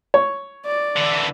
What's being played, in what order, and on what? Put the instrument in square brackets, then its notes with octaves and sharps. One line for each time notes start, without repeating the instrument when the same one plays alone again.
[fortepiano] C#5
[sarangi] D5
[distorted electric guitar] D3 E3